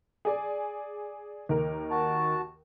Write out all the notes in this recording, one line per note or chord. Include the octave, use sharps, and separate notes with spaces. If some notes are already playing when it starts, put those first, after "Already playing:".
G#4 D5
D#2 A#4
F#4 A5